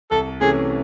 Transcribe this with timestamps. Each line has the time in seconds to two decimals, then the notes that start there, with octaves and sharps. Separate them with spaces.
0.11 C2 A4
0.41 C3 E3 A3 C#4 G#4